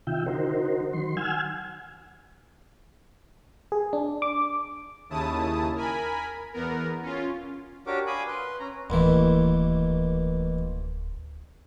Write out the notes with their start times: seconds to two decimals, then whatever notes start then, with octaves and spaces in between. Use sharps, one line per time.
0.07 C3 D#3 F4 E5 G5
0.26 D3 D#4 F#4 A#4 C5
0.93 D#3 F#3 C6
1.17 F#5 G#5 E6 F6 G#6
3.72 G#4
3.93 D4
4.22 D6
5.10 D#2 C#3 E4 A5 D#6
5.75 A#4 G#5 B5
6.53 E2 B3 A#4
7.02 C#4 F4
7.87 D4 F#4 G4 A#4 C#5 D6
8.07 F5 G#5 B5 D6 D#6
8.27 B4 C6
8.60 C#4 A#5
8.90 D1 A1 D#2 E3